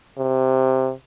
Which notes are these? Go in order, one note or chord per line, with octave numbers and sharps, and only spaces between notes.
C3